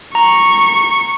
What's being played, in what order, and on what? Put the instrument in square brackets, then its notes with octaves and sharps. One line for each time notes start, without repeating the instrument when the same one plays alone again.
[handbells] A#5 [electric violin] C#6